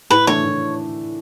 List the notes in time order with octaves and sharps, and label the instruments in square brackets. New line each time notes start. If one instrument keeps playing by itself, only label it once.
[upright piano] A2 [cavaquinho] B4
[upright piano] E3 A3 D4 [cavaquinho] C#5
[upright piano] A2